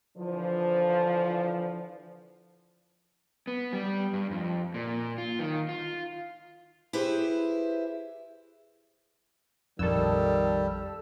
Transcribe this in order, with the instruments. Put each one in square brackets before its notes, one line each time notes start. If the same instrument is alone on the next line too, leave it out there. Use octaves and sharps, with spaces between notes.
[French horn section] D3 E3 F3
[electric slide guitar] B3
G3
G2
F2
A#2
F4
D#3
F4
[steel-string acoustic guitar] E4 G4 G#4 B4 C5
[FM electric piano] A#1 F2 [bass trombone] D#3 [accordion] G3 [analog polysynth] A4 E6